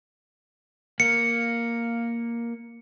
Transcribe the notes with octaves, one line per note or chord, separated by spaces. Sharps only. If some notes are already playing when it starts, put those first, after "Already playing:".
A#3 C#7